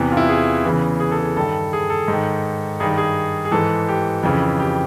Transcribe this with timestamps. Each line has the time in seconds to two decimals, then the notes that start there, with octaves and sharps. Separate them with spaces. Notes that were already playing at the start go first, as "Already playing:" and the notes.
Already playing: E2 C3 E3
0.12 F4
0.17 E4
0.29 G#4
0.64 E2 C#3 E3
1.00 G#4
1.11 A4
1.18 G#4
1.37 G2 D#3 A4
1.73 G#4
1.90 A4
2.08 G#2 D#3
2.80 G2 D#3 G#4
2.97 G#4
3.45 G#4
3.52 G#2 E3 A4
3.88 G4
4.23 F2 C#3 E3
4.60 G4